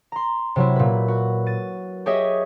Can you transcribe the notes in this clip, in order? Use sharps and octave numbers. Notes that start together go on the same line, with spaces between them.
A#5 C6
C3 F#3 E4
A#2 B4
F#4
A6 D#7
G4 G#4 C#5 D#5 E5